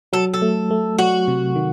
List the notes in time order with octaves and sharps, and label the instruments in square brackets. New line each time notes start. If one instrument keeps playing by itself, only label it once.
[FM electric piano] F#3 [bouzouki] A4
[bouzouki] A4
[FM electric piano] A3
A3
[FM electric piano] F#3 [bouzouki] F#4
[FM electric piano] C3
D#3